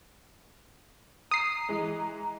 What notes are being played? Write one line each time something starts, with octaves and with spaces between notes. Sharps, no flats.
A#5 D#6 C7
E3 G#3